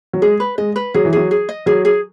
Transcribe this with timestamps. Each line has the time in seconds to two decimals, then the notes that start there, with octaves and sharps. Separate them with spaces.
0.13 F#3
0.22 G#3 G#4
0.40 B4
0.58 G#3 D#5
0.76 B4
0.94 F#3 G#4
1.05 E3
1.13 F#3 G#4
1.31 G#4
1.49 D#5
1.66 F#3 G#4
1.85 G#4